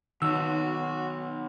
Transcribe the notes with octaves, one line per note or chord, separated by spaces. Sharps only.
B1 D#3 F#4 E6